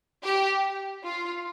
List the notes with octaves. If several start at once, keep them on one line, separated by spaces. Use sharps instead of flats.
G4
F4